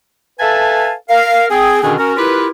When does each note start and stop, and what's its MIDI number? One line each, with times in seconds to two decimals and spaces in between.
0.40 0.93 69
0.40 0.93 71
0.40 0.93 76
0.40 0.93 77
0.40 0.93 80
0.40 0.93 81
1.09 1.46 70
1.09 1.46 77
1.50 1.80 60
1.50 1.80 68
1.83 1.94 47
1.83 1.94 50
1.83 1.94 51
1.83 1.94 61
1.83 1.94 62
1.83 1.94 68
1.98 2.15 61
1.98 2.15 66
1.98 2.15 70
2.17 2.47 64
2.17 2.47 65
2.17 2.47 67
2.17 2.47 70
2.17 2.47 71